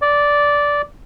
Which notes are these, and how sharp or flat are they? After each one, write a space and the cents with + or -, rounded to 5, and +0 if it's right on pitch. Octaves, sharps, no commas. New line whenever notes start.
D5 -10